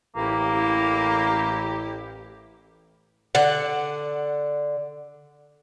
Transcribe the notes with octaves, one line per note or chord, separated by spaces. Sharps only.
A1 A#3 E4 G4
D3 F#5